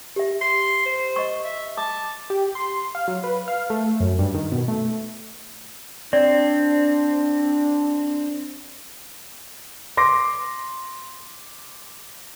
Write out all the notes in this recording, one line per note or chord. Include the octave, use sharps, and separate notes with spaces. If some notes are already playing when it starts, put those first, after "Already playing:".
G4 E5
C6
C5
D#5 C#6
E5
A5 D6
G4
C6
F5
F#3
B4
F5
A3
F#2
G2
D#3
B2
A3
C4 D4 D5
C6 D6 A#6